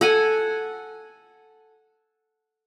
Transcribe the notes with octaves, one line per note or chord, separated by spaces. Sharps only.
A4 F#5 G#5